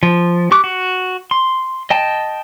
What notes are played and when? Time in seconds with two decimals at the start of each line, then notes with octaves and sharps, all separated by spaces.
0.03 F3
0.51 G4 C#6 D6 F#6
0.64 F#4
1.31 C6
1.90 D#5 G5 A5